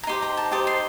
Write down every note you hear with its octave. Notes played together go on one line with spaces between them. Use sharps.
A#5
D#4 G4 C5 C6
A#5
A5
D#4 G4 C5 A5
C6